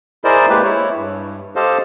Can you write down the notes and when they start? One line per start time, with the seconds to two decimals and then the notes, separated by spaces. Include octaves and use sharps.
0.24 E4 G#4 A#4 C5 D5 D#5
0.49 G#3 A#3 G4 B4
0.64 E4 C#5
0.96 G2
1.56 G4 A4 C5 D#5 F5